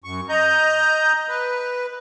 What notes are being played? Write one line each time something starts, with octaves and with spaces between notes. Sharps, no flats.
F#2 C#6
D#5 A#5 G6
B4